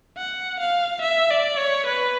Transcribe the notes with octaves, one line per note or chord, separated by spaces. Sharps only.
F#5
F5
E5
D5
C#5
B4